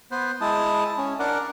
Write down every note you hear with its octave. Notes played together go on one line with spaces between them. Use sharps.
B3 B4 C5
G#3 E4 A5 D#6
C#4
D4 A#4 D5 F#5